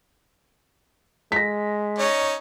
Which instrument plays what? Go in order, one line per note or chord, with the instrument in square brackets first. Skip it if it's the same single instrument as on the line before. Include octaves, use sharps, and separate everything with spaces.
[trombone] G#3 [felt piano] A#6 B6
[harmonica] C#4 D#4 [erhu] C#5